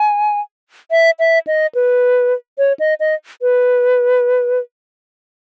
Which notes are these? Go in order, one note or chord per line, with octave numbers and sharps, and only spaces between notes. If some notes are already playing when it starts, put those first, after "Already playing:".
Already playing: G#5
E5
E5
D#5
B4
C#5
D#5
D#5
B4